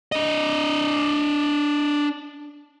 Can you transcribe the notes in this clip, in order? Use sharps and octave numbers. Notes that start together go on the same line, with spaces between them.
D4 D#5